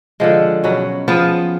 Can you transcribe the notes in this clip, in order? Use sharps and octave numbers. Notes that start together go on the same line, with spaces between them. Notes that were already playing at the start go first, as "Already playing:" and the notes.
D3 F3 G#3
B2 F#3 C#4
F3 B3 F4 G#4